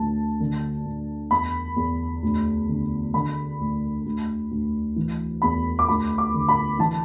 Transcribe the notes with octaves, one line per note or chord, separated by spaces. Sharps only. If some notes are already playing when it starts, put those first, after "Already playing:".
Already playing: D2 D3 A5
D3
D2
E2 B5
E2
D2
D3
D3 B5
D2
D2
D2
E3
E2 B5
D6
D2 B5
D6
D3
B5
E3 A5